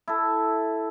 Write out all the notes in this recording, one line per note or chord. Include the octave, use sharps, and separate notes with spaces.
E4 A4